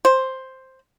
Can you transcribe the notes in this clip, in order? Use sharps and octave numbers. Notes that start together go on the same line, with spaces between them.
C5